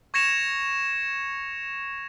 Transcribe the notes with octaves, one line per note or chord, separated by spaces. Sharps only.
C#6 G#6 A#6 C#7 E7 F7